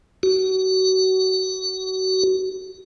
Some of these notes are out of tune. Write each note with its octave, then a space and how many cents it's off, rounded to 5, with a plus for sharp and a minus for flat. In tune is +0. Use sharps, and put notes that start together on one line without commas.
F#4 +30